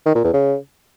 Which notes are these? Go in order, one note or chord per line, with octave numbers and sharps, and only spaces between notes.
D#3
A#2
E2
C#3